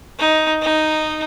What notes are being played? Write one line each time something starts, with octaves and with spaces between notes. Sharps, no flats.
D#4
D#4